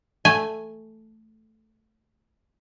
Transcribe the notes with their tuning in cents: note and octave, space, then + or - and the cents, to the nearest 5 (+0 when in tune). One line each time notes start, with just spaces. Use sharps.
A3 +0 G#5 +0